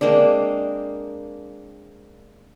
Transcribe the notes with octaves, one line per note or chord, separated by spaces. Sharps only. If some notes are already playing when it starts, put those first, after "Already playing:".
G#3 A#3 C4 D4